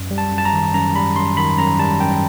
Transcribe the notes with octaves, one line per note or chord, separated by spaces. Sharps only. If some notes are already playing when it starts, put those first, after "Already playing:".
Already playing: F#2
G3
A5
F#2
A5
A#5
D#3
F#2 A#5
G3 B5
F#2 C6
D#3 B5
F#2 A#5
G3 A5
F#2 G5